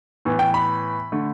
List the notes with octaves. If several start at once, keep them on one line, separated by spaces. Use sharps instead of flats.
A2 E3 B3
G5
B5
D3 A3